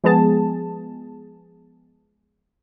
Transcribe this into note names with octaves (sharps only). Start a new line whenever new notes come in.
F3 G#3 B3 G#4 A5